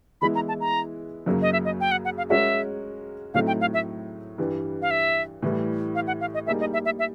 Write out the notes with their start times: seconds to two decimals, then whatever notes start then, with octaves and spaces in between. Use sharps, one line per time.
0.21 E3 G#3 B3 E4 B5
0.35 A#5
0.48 A5
0.60 A#5
1.26 F#2 C#3 F#3 A#3
1.42 D#5
1.53 E5
1.65 D#5
1.81 G5
1.91 F#5
2.05 F#5
2.18 F5
2.30 G#3 C#4 F#4 A#4 C#5 E5
3.34 A2 F#3 A3 C4 D#4 F5
3.47 G5
3.61 F5
3.74 E5
4.38 G2 E3 G3
4.82 F5
4.91 E5
5.42 A2 E3 G3
5.95 F5
6.07 F#5
6.21 F5
6.34 D#5
6.46 G3 A#3 D#4 G#4 E5
6.60 D#5
6.73 E5
6.85 E5
6.99 E5